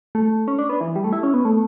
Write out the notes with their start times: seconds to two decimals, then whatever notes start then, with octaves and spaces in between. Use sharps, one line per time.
0.15 A3
0.48 C#4
0.58 D4
0.69 B3
0.81 E3
0.96 G3
1.04 A3
1.13 E4
1.23 C#4
1.34 B3
1.45 A3